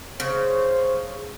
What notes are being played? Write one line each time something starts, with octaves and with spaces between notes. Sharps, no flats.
C#3 C5